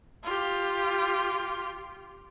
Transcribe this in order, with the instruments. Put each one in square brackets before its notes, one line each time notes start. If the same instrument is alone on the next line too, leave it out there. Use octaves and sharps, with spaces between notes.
[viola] F4 G4